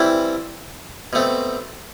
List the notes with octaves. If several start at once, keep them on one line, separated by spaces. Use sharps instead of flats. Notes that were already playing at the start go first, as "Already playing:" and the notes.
Already playing: E3 G3 C4 E4
B2 A3 C4